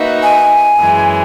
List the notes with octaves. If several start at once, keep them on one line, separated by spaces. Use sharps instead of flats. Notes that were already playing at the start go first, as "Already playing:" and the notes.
Already playing: A#3 D#4 F#4 B4 E5
G#5
F#2 E3 G#3